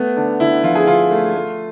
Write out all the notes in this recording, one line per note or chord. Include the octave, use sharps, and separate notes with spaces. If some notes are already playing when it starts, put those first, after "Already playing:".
Already playing: A3 B3
D3 D4
D3 E4
F3 F4
G#4
D3 F4
A3
A3